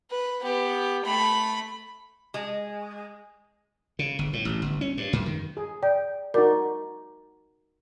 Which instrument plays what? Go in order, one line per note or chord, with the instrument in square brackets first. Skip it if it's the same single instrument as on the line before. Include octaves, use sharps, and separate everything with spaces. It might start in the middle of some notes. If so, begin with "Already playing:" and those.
[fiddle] B4
B3 G4
A3 B5
[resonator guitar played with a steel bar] G#3
[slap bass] C#3
G1
A2
A1
G1
C#4
G2
F#2
D#3
[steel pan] G#4
[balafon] D5 [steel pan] G5
[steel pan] D#4 F#4 D5 [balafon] A#4